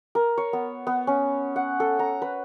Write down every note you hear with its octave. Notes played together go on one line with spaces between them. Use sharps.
A#4
C#5
B3
B3
C#4
F#5
A4
A#5
B4